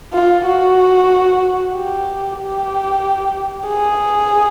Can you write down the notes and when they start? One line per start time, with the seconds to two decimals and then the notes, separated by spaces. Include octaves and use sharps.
0.14 F4
0.46 F#4
1.75 G4
2.39 G4
3.68 G#4